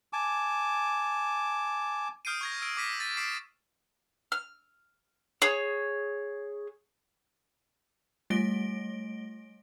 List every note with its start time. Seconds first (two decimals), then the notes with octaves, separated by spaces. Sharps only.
0.13 G#5 A5 D6
2.25 D#6 F6 G6 C7 D7 D#7
2.41 C#6 G#6 A#6
2.62 E6 G#6 D7
2.77 D6 A#6 B6 D#7
3.00 A6 B6 D#7
3.17 D6 A6 B6 C7 D7 E7
4.32 F6
5.42 G#4 C#5
8.30 G3 A3 A#6 D7 G7